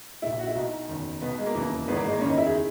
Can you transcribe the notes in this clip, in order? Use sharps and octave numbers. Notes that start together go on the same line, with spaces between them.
A#1 A#2 E4
F#4
E4
B1 B2 D#4
F#1 E2 D#3
B1 B2 B3
G#3
A#3
E1 D#2 C#3 E3
G#1 G#2 E3 B3
A#3
G#3
A#3
F#1 E2 D#3 C#4
D#4
E4
G#4